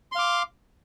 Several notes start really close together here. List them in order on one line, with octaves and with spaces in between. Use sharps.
C6 F5 D6